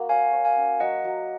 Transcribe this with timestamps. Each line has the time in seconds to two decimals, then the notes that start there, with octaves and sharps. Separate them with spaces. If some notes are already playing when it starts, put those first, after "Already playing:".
Already playing: A#3 F#4
0.09 C#5 F5 G#5
0.33 C#5
0.45 F5 G#5
0.56 C#4
0.80 F#3 D#5 F#5
1.04 F#3